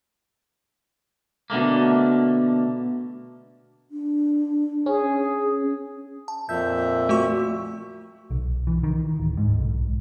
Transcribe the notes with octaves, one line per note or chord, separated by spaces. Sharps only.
B2 D3 A3 A#3
D4
C#4 G#4
A5
F2 A#2 E5 G6
A3 F#4 C#6
B1
E3
D#3
D1
G#2
B1